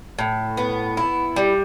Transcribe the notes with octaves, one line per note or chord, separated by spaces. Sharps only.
A2
B3
E4
G3